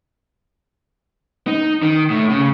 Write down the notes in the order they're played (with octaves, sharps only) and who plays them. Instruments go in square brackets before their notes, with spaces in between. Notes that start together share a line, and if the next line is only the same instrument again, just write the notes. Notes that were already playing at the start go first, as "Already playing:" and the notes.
[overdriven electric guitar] D#4
D#3
A2
C#3